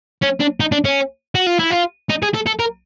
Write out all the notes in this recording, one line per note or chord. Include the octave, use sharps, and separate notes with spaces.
C#4
D4
D#4
D4
C#4
F#4
F4
E4
F4
D#4
G#4
A4
A4
A#4